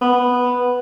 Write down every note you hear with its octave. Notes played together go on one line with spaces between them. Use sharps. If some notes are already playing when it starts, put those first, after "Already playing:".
B3